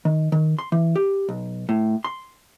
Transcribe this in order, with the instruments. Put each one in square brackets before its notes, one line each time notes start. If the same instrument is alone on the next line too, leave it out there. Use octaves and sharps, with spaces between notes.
[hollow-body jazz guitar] D#3
D#3
C6
E3
G4
B1
A2
C6